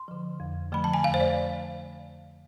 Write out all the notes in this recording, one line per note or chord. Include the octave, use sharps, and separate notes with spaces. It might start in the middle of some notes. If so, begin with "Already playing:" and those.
Already playing: C6
D3 F3
F2
D3 F3 A3 B5
A5
G#5
F2 F5
C5
D5